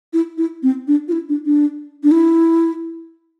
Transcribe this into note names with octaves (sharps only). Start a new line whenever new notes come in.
E4
E4
C4
D4
F4
E4
D4
D4
D4
E4